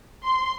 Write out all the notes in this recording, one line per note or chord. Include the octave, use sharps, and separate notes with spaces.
C6